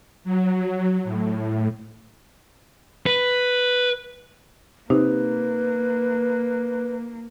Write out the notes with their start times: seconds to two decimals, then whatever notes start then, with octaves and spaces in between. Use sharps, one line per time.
0.24 F#3
1.04 A2
3.06 B4
4.90 C3 A#3 D#4 B4